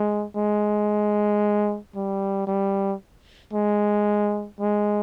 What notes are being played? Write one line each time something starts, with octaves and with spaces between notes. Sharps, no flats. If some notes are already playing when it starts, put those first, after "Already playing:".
Already playing: G#3
G#3
G3
G3
G#3
G#3